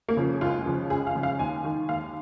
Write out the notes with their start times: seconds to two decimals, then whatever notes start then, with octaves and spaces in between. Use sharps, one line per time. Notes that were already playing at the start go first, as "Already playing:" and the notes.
0.08 A#3
0.17 C#3 F3
0.41 C#2 F4
0.66 C#3 F3
0.90 C#2 G#4
1.07 F5
1.15 C#3 F3
1.23 F5
1.39 D#2 G#5
1.65 D#3
1.89 D#2 F5